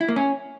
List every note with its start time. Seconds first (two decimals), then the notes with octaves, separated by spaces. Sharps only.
0.01 E4
0.08 A#3
0.16 C#4